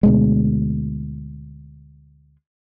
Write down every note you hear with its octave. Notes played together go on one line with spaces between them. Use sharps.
D2 B2 G#3